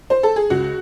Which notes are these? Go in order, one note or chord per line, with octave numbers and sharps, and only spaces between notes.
C5
A4
G#4
C#2 F#4